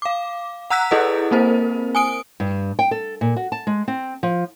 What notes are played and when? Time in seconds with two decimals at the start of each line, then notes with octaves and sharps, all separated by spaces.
0.02 F5 D6
0.70 F#5 A#5 E6 F#6 B6
0.91 E4 G#4 A4 B4 D#5 F#5
1.31 A#3 C4 A#4 C5
1.95 G#5 D#6 D7
2.40 G2
2.79 G5
2.91 A4
3.21 A#2
3.36 F#4
3.52 A5
3.67 G#3
3.88 C4
4.23 F3